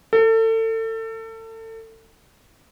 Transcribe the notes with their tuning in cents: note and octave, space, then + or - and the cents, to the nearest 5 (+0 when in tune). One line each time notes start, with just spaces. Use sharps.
A4 +30